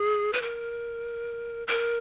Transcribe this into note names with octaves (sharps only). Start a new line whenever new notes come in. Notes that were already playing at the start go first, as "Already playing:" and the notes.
Already playing: G#4
B4
A#4
A#4